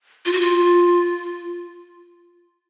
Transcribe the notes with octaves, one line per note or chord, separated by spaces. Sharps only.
F4
F#4
F4